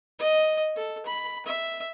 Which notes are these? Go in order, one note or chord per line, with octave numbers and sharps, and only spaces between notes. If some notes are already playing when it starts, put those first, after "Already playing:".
D#5
A4
B5
E5